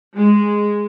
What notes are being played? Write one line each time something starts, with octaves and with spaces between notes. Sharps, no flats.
G#3